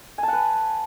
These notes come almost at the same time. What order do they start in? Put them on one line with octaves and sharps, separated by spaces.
G#5 A5 F#5 B4